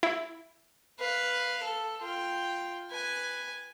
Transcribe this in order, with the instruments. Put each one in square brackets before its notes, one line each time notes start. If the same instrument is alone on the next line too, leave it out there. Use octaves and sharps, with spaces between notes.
[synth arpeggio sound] E4
[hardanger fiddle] B4 F5
A4
F4 G5
B4 G#5